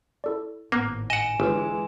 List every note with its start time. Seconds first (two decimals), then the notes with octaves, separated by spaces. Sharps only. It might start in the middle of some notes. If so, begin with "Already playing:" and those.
0.24 E4 A4 D5
0.72 G#1 A2 A#3 B3 D6 F#6
1.10 D#5 F#5 G#5 E7
1.40 G1 E3 G#3